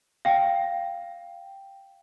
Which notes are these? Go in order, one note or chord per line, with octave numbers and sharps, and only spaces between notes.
F5 G5